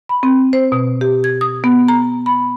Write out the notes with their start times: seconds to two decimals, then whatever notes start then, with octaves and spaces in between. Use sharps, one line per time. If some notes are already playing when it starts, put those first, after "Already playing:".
0.09 B5
0.23 C4
0.53 C5
0.72 B2
1.01 G4
1.24 G#6
1.41 D#6
1.64 B3
1.88 A#5
2.26 B5